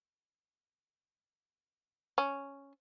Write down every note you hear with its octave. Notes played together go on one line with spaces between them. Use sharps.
C#4